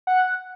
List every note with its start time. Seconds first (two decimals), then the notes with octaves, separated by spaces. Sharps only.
0.07 F#5